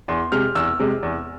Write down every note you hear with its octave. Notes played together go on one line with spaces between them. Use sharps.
E2 C6
C3 G#3 F6
E2 E6
C3 G#3
E2